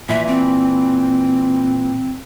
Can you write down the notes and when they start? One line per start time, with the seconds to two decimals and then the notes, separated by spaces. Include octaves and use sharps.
0.09 A#2 E3 E5
0.27 C4